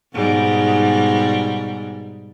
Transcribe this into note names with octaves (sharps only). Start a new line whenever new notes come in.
G#2 B2 G3